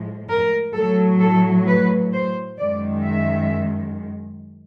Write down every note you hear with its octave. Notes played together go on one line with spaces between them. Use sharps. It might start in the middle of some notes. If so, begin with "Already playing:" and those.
Already playing: A2 F3 G#3
A#4
A2 F#3 A4
A4
B4
C5
F#2 D#3 G#3 D5
E5